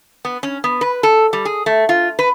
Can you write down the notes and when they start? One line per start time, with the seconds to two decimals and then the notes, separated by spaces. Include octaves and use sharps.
0.25 B3
0.43 C#4
0.64 B3
0.81 B4
1.03 A4
1.33 G3
1.45 G#4
1.66 A3
1.89 F4
2.19 B4